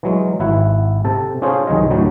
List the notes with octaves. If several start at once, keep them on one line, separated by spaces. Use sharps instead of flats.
E3 F#3 G#3
G#1 E4 F#5
C3 A4 A5
C#4 D4 F4 G#4 C5 C#5
C2 D#3 F#3 G#4 D#5
D2 A2 D3 F#3